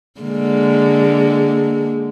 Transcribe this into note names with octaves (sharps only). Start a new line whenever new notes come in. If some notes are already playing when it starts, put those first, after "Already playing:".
D3 G#3 A#3